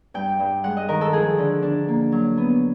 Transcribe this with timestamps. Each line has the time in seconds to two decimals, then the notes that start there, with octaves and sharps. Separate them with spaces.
0.14 G2 G5
0.40 G2
0.64 G#3 F#5
0.77 D#5
0.89 D#3 A#4
1.01 A4
1.13 F3 G#4
1.38 D3
1.62 D4
1.88 A#3
2.12 F#3
2.37 B3